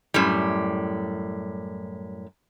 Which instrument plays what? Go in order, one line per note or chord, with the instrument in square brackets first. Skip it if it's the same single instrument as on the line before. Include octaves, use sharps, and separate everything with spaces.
[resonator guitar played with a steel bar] F#2 A2 G3